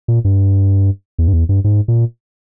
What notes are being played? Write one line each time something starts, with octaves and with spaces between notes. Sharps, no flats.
A#2
G2
E2
G2
E2
G2
G#2
A#2